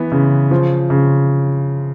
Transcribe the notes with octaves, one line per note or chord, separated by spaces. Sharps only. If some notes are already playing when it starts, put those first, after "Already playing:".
Already playing: E3 B3
C#3
F3
C#3